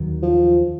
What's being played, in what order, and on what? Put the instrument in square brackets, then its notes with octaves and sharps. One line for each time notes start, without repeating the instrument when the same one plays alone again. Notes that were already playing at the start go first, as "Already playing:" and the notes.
Already playing: [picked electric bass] D#2 D#3 F#3
[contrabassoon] F3